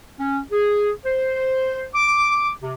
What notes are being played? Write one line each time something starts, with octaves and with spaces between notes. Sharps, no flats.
C#4
G#4
C5
D6
C3